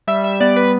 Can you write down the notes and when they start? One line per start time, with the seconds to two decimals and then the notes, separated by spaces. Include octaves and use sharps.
0.07 G3 E5
0.24 E5
0.40 B3 D5
0.56 B4